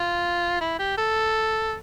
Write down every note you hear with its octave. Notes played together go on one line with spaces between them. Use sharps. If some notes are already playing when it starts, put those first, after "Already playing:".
Already playing: F4
E4
G4
A4